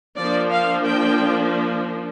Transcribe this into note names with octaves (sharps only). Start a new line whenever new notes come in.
F3 A#3 D4 D5
F5
G5